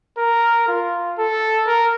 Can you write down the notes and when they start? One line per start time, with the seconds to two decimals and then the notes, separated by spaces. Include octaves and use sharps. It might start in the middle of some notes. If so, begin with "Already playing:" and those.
0.18 A#4
0.68 F4
1.18 A4
1.67 A#4